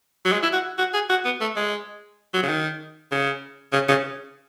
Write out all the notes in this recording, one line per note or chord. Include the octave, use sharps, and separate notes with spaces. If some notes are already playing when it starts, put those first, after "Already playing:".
F#3
G#3
E4
F#4
F#4
G#4
F#4
B3
A3
G#3
F#3
C#3
D#3
C#3
C#3
C#3